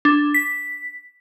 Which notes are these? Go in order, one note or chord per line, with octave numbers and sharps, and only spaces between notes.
D4
B6